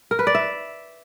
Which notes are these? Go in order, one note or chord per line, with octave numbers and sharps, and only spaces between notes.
A#4
B4
D5
E5